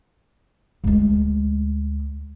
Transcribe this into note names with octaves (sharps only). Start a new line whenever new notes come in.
D2 G#3